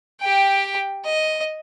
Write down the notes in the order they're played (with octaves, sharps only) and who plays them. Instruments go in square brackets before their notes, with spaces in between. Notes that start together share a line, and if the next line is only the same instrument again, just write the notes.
[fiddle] G4 G5
D#5